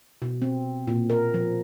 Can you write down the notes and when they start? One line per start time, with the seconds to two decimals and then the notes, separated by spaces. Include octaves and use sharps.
0.22 B2
0.42 C4
0.87 A#2
1.10 A#4
1.34 F3